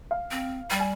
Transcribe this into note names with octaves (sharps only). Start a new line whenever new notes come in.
F5
C4
G3 G5
G#5